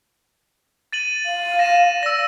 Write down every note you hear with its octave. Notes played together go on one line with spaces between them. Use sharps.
A6 D#7 F#7
F5
A#6 D#7 E7
D5 E6 A#6